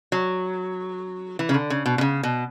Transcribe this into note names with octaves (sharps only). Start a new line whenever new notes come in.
F#3
E3
C#3
D3
C#3
B2
B2
C#3
B2